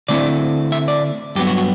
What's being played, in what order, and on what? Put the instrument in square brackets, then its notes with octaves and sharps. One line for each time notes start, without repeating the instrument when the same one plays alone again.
[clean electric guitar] D3 A3 C4 E4 D5
E5
D5
G2 F#3 B3 G4
F#4
F#4